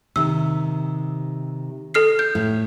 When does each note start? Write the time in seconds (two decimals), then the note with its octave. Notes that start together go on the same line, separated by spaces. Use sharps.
0.16 C3 D#3 E6
1.94 A4 F6 C7
2.19 G6
2.35 A2